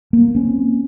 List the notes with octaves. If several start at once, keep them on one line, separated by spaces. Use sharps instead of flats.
A#3
C4 C#4